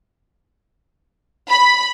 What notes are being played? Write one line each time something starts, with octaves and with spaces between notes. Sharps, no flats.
B5